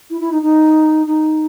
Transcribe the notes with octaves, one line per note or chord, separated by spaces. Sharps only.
E4
E4
D#4
D#4
D#4